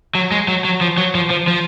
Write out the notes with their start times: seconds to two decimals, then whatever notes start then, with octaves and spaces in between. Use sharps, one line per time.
0.15 F#3
0.32 G#3
0.48 F#3
0.65 F#3
0.81 F3
0.98 F#3
1.15 F3
1.30 F3
1.48 F3